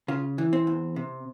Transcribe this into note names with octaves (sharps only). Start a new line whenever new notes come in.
C#3 F4
E3
C4
E2
C3